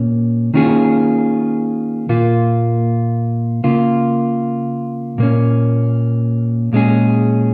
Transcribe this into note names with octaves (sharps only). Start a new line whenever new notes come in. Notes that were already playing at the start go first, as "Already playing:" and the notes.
Already playing: A#2 A#3 C#4
D#3 A#3 C#4 F4 G#4
A#2 A#3 F4
C#3 A#3 F4
A#2 A#3 C#4
A#2 G#3 C#4 G#4